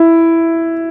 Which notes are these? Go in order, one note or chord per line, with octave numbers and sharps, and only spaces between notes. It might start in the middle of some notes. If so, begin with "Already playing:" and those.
Already playing: E4